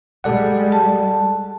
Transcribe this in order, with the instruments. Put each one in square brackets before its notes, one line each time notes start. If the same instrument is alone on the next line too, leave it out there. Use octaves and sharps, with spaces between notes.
[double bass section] G3 G#3 [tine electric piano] A4 D5 F#5
[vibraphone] A5